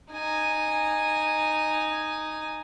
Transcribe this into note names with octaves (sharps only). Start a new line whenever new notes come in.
D#4 G#5